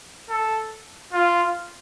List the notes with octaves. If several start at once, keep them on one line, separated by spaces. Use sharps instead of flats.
A4
F4